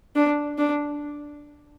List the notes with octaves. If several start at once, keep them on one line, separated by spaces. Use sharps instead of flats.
D4
D4